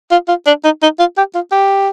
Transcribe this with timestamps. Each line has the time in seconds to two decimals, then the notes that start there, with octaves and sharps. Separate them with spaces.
0.11 F4
0.28 F4
0.47 D4
0.64 D#4
0.82 D#4
0.99 F4
1.17 G4
1.35 F4
1.52 G4